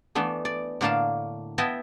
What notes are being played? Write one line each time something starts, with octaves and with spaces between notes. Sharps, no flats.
E3 A3 B3 D4
D5
A2 D3 A#3 D5 F5 A5
B3 E4 D#5 E5 G5 A5